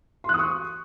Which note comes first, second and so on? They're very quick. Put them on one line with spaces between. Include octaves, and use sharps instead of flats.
C6 F#6 D#6 C#6